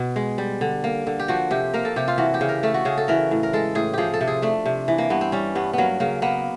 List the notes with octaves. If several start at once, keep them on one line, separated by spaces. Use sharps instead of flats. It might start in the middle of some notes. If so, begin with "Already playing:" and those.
Already playing: B2
G#3
G3
D3
A#3
D3
G4
F3 F#4
C3 G4
A#3 A#4
A4
C3 G4
F4
E3 F#4
G4
C#3
A#4
A3 A4
F#4
C#3 G#4
A4
E3 A#4
A2
A#4
G#3 A4
A2 G#4
F3 G4 G#4
A4
C3
G#4
A3 D4
C3
E3
A#3
G2 B3
C4
G3 C#4
G2 B3
F#3 A#3 B3
C#3 A#3
A#3 B3